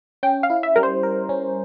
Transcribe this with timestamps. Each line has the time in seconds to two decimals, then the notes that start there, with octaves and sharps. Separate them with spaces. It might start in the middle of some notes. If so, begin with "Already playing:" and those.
0.23 C#4 G5
0.43 F5
0.50 E4
0.63 E5
0.76 G3 A#4
0.83 C5
1.03 A#4
1.29 C#4